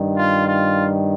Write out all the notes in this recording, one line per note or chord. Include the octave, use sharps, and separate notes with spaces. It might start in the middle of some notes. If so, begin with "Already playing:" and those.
Already playing: G2 D#3
F4
F4